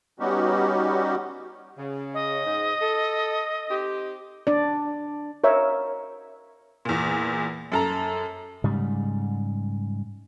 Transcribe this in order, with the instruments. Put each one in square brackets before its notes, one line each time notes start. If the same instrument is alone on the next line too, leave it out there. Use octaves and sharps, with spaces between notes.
[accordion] G3 B3 C#4 D#4 F#4 G4
[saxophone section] C#3
[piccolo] D#5
[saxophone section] G#2
A4
C4 D#4 G4
[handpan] D4 D5
[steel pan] A#4 C#5 E5
[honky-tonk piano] E2 A#2
F#2 A4 A#5
[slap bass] G#2 C#3 G3